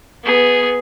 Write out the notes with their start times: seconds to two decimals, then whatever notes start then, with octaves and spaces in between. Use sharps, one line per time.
0.24 B3 G#4